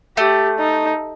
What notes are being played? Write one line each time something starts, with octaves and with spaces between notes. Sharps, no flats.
A3 G4
D#4